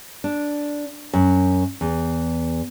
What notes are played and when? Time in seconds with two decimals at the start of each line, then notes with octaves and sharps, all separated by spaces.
0.24 D4
1.14 F#2
1.81 E2